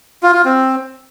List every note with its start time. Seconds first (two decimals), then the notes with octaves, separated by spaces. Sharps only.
0.23 F4
0.34 F4
0.45 C4